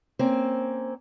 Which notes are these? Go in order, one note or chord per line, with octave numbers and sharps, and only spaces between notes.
A#3 C4 C#4 C5